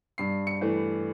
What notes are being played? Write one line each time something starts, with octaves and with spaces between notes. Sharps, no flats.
G2 C7
C#7
E3 A3